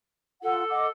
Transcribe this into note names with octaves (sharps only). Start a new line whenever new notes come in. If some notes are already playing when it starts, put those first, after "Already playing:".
F4 A4 F#5
D#5 F#5 D6